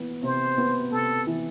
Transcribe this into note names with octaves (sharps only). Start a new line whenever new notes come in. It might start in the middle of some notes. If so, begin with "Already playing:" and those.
Already playing: E3 B3
C3 C5
B3
C3 A4
E3